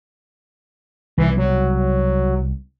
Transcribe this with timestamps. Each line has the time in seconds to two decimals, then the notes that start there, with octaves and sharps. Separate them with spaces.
1.18 C2 B2 E3
1.37 F#3